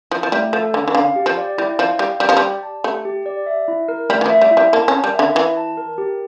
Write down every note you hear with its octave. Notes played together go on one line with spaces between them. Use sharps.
F3 E4
F3
G3 A3
F3 A4
D3 C#4
E3
D3 F5
G4
F3
D5
G3 E4
F3 F5
G3 G4
G3 G4
F3
G3
D5
A5
A3 G4
G4
D5
E5
E4
A#4
G3 A3
E3
F3
E5
G3
E4
G3
A#3 A5
C#4
A#4
G3
D3 E5
E3 E4
A5
A#4
G4